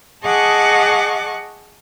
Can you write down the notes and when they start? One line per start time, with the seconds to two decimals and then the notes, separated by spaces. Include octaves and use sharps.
0.24 G#4 D#5 F#5 A5 C#6 D6